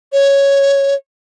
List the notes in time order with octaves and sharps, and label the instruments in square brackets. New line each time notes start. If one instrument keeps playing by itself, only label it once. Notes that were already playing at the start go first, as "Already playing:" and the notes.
[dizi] C#5